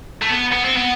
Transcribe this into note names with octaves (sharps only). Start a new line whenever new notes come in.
A3
B3
B3
C4
B3